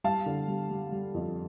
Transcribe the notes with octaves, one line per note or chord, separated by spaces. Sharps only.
G3 F5 A5
D3
G3
G3
G3
F2